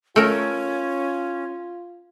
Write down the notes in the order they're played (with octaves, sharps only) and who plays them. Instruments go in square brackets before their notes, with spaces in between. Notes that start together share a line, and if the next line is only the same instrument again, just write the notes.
[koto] A3 A#4 [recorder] C#4 [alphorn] F4